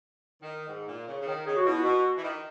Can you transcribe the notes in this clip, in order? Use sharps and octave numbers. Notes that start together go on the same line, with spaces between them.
D#3
G#2
A#2
C#3
C#3
D#3
C#3 G#4
F#4
B2 E4
F#4
B2
E3
D#3